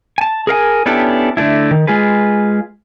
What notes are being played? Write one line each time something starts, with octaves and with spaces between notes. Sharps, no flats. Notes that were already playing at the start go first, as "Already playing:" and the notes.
G#5 A5
G#4 A#4 F5 G#5
B3 C#4 D4 E4 G4 A4
D3 A3 D4 E4
D#3
G#3 F4 G#4 B4